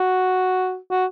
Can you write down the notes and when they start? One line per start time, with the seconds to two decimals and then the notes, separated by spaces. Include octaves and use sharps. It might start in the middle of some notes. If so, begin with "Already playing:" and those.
Already playing: F#4
0.91 F#4